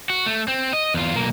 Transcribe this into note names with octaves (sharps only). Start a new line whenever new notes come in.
F#4
A3
C4
D#5
E2 F4
B1 A#3